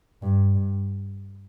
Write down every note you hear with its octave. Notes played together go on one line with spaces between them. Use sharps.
G2
G2